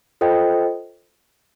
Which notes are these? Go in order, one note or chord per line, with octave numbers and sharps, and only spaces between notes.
F4 A4 C5 D#5 G5